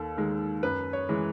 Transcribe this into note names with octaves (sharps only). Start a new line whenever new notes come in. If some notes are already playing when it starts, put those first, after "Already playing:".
Already playing: D#2 A4
D#3 G#3
F#2 B4
C#5
E3 G#3